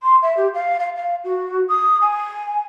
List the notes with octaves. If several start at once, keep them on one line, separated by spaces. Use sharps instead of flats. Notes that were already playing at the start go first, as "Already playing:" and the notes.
C6
E5
G4
F5
F5
F5
F#4
D#6
G#5